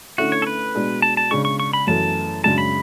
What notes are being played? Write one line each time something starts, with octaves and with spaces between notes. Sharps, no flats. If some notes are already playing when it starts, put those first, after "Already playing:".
D3 A3 C#4 E4 F#4
C#5
A4
B4
B2 G#3 D4
A5
A5
C#3 G#3 D4 C#6
C#6
C#6
B5
F#2 E3 A3 A5
F#2 C#3 G#3 D4 A5
B5